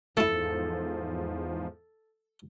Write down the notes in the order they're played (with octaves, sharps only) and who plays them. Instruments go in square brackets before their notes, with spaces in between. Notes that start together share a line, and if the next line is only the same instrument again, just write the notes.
[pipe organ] E2 G#2 F3 [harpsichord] A3 E4 [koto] A4